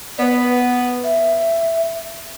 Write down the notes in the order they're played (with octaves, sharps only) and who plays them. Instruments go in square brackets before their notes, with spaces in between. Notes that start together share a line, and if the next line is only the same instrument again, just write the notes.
[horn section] B3 [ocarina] B4 D5
[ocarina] E5